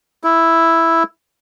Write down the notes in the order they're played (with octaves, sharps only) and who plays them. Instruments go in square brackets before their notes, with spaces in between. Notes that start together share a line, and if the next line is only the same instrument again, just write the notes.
[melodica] E4